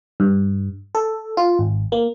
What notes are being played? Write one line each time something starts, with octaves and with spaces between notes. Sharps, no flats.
G2
A4
F4
G#1
A#3